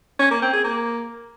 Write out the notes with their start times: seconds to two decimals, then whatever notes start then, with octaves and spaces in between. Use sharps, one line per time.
0.19 C#4
0.30 A#3
0.42 C4
0.53 G#4
0.64 A#3